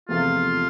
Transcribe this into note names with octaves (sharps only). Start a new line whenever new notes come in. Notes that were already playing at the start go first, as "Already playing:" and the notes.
E2 C3 F3 A3 F4